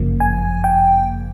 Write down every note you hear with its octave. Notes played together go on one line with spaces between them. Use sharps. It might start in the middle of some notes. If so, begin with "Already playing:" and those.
Already playing: G1 F#2 C#3 F3 A#3
G#5
G5